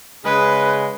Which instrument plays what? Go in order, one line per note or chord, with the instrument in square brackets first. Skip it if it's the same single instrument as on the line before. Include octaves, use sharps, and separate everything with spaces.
[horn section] C#3 G#3 G#4 [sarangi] B4